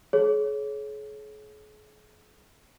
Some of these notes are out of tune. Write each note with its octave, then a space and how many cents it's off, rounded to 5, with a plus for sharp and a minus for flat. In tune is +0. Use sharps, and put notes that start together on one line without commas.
G#4 +40 C#5 +0